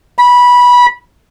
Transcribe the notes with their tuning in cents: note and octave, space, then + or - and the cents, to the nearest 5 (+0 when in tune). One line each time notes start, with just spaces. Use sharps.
B5 -15